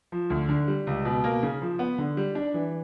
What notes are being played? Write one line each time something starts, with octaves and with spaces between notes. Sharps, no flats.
F3
D2
D3
G3
C#2
B2
A#3
C#3
F3
B3
D3
G3
D4
E3